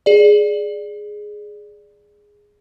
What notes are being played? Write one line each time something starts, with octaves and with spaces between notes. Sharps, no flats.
G#4 D5